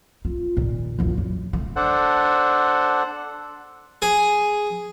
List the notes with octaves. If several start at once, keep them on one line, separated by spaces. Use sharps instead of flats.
F4
D#2 A#2
A#1 E2
F#2
A3
D4 A4 C5 F#5
G#4